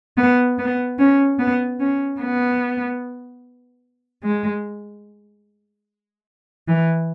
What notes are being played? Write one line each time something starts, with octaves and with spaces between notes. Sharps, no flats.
B3
B3
C#4
B3
C#4
B3
G#3
E3